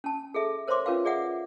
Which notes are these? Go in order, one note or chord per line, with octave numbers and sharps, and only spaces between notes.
C#4 A5
G#4 A4 E5
A#4 C5 C#5 E5 C6 D6
C#4 F4 A#4 B4 F5
G#4 D5 E5 F#5